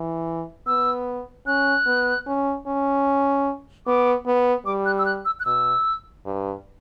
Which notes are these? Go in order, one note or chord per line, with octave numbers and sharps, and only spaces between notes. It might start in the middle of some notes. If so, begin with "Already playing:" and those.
Already playing: E3
B3 E6
C#4 F#6
B3
C#4
C#4
B3 D6
B3
G3 D6
F#6
E6
F#6
E6
F#6
B2 E6
G2